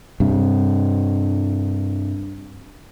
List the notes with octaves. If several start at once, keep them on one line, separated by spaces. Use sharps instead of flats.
G2 C3